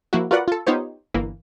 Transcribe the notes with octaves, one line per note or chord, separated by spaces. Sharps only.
F3 A#3 E4 F#4
F4 F#4 A#4 B4 D5 F#5
F4 A4
B3 D#4 F4 G4 C5 C#5
G1 E3 A#3